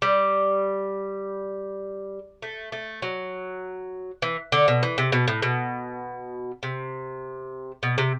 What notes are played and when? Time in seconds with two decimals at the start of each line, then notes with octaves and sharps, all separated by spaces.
0.02 G3
2.42 A3
2.72 A3
3.02 F#3
4.22 E3
4.52 D3
4.68 B2
4.83 E3
4.98 C3
5.12 B2
5.28 A2
5.42 B2
6.63 C3
7.83 B2
7.98 C3